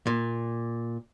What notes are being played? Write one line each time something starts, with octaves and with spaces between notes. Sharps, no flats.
A#2